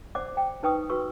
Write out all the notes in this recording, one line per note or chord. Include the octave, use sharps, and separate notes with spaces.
C5 D5 F#5 D6
G5
D#4 B4 G5 C#6 D#6
F#4 B4 C#6 E6